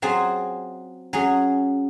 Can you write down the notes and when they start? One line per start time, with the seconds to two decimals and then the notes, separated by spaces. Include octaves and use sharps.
0.02 F#3 C4 F4 G#4
1.13 F#3 C#4 G#4